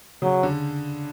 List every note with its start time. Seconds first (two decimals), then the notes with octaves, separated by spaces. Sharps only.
0.22 C#3 F#3
0.43 D3